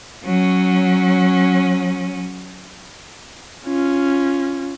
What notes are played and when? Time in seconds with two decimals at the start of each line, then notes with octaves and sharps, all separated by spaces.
0.25 F#3 C#4
3.66 C#4 F4